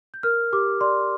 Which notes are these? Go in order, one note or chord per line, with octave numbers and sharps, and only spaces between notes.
G6
A#4 F6
G4 D6
D5 C6